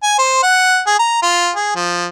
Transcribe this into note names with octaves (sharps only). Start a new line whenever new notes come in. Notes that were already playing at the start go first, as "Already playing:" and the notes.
G#5
C5
F#5
G#4
A#5
F4
G#4
F3